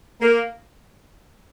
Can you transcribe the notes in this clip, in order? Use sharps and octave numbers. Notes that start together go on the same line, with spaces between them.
A#3